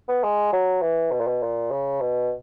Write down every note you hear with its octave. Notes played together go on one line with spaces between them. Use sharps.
B3
G#3
F#3
E3
B2
A#2
B2
A#2
C#3
B2